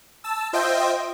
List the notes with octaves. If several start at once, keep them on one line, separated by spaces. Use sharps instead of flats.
A5 E6
F4 C5 D#5 E5 G5